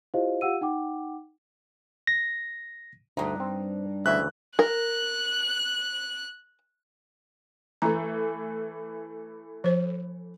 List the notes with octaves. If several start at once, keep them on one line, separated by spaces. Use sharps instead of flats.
E4 F4 G4 C5 D#5 F5
F4 G4 F5 F#5 E6 D#7
D#4 F#5 G5 D6
A#6
D2 G2 D#4
C4
D2 C#3 E3 E5 F#6
A#4 F#6
E3 A3 A#5
F3 C5